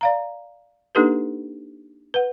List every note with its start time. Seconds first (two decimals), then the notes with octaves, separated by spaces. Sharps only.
0.01 D5 F5 A#5
0.95 A#3 D4 D#4 G4 A4 B4
2.14 B4 F#5